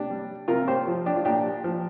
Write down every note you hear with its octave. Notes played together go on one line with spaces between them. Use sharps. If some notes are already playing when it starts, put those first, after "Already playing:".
Already playing: C3 D4 G4
G3
C3 F4 A#4
G4 C5
F3
D4 G4
F4
A#2 D4 G4
F3